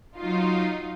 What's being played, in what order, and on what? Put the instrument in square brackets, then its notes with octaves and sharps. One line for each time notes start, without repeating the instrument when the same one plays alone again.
[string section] F#3 D#4 F4